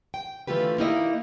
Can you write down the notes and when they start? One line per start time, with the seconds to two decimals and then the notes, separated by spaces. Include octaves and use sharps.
0.14 G5
0.47 D3 E3 A3 F4 G4 B4
0.78 A#3 D#4 E4 G4 D#5